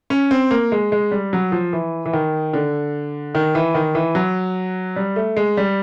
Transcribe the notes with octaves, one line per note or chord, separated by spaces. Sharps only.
C#4
C4
A#3
G#3
G#3
G3
F#3
F3
E3
E3
D#3
D3
D#3
E3
D#3
E3
F#3
G3
A3
G#3
G3